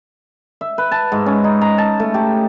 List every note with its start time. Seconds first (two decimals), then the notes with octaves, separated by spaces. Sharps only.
0.61 E5
0.78 B4
0.92 A5
1.12 G#2
1.26 C#4
1.44 D#4
1.61 A#5
1.78 A5
2.00 A3
2.14 G4